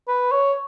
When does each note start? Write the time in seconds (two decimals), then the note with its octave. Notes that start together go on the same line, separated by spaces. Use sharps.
0.08 B4
0.31 C#5